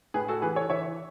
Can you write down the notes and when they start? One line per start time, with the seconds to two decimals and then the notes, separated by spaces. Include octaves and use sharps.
0.14 A2 G#4 B4
0.28 F#4 A4
0.42 E3 G#4 B4
0.56 A4 C#5
0.70 E3 C#5 E5